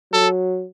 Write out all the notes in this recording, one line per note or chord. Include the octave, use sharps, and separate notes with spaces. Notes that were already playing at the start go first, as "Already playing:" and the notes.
F#3 A4